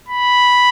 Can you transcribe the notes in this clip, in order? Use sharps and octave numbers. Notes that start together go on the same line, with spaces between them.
B5